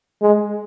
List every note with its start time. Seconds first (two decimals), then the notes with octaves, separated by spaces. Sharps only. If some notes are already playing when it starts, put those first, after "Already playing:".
0.22 G#3